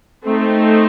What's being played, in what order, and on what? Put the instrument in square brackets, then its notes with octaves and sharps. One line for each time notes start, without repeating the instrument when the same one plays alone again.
[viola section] A3 C4 D#4